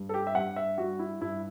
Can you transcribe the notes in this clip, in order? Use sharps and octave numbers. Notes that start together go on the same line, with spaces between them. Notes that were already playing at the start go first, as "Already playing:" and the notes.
Already playing: G2
A4
G4
E5
G2 F#5
E5
G3 F#4
E4
G2 E4